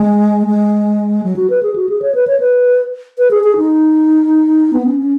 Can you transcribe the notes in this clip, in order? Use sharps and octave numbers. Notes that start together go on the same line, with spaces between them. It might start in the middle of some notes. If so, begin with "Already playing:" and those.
Already playing: G#3
G#3
F#3
F#4
B4
G#4
F#4
G#4
C#5
B4
C#5
B4
B4
G#4
G#4
D#4
B3
C#4
C#4